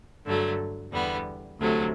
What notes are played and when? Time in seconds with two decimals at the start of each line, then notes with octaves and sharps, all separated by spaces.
0.24 G2 D3 F#3 A3
0.92 E2 D3 G3 B3
1.58 D2 C3 F#3 A3